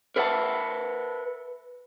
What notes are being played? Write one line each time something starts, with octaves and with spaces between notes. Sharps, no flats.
A#4 B4 E5 F#5 G#5 A5